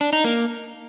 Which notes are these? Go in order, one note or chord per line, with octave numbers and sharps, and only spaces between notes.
D4
D#4
A#3